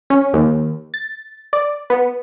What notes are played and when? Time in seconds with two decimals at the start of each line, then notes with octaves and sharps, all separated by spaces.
0.10 C#4
0.33 D#2
0.94 A6
1.53 D5
1.90 B3